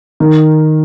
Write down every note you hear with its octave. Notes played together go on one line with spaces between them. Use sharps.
D#3